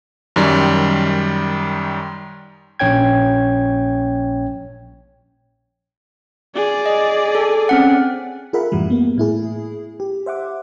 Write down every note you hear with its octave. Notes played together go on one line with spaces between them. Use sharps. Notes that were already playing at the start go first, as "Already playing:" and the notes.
F#2 D#3 G3
A#1 C#4 C#5 G5 G#6
G#4 D5
D#5
A4
C4 C#4 F#5
F4 G#4 A#4 E5 F#5 B5
F#2 A2 E3 G3
A#3 B3
A2 E4 G#4
G4
C5 E5 F#5 D6